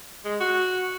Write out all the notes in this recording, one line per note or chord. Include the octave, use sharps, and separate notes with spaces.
G#3
F#4